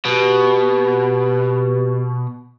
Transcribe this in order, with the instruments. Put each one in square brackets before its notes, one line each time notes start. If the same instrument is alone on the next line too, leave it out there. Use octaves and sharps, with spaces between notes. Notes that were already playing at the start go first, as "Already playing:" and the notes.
[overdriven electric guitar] B2 [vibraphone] G4 B4